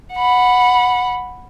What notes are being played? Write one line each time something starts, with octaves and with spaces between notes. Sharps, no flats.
F#5 B5